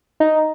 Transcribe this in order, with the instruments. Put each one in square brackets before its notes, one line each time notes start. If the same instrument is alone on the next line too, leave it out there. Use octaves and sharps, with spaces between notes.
[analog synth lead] D#4